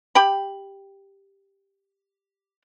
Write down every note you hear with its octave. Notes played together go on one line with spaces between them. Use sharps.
G4 G5 B5